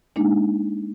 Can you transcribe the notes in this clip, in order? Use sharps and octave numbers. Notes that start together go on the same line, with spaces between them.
G#3 A#3 D4 D#4